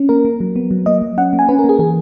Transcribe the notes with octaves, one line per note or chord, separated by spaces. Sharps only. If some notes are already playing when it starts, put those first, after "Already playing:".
Already playing: C#4
A#3 A#4
A#3
F#3
B3
F#3
A#3 D#5
F#3
C#4 F#5
A#3
G#5
C#4 B4
A#4
A#3 G#4
E3 G#4